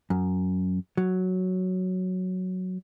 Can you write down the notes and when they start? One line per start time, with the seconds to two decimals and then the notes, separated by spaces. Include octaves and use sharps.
0.10 F#2
0.97 F#3